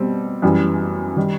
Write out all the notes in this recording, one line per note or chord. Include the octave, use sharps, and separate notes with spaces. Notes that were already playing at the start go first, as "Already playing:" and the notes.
Already playing: B2 G3 C4
F#2 E3 G3
D#3 G3